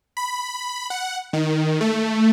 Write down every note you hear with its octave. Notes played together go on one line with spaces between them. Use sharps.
B5
F#5
D#3
A3